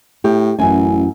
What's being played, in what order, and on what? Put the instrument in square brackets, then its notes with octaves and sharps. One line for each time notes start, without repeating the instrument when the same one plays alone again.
[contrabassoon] A2 [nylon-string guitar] G4
[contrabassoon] A1 [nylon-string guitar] F#2 E4 G#5